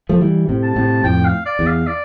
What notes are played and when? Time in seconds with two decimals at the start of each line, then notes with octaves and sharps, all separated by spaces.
0.09 F3 A3
0.21 E3 G3
0.49 A2 C3
0.63 A5
0.76 A2 C3
1.04 F2 A2 G5
1.25 F5
1.46 D5
1.59 E2
1.67 F5
1.87 D5